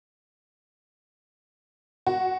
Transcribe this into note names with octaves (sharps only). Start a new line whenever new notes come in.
F#4